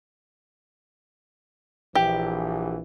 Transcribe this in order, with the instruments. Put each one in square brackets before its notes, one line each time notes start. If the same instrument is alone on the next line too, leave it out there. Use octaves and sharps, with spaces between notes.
[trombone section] A#1 E3 [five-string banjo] G4